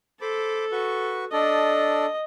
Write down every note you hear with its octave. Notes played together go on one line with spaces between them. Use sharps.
A4 C5 B5 D6
F#4 B4 C#6
D4 A4 D5 D#5